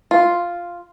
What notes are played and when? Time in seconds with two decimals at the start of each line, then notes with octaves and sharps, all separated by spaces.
0.11 F4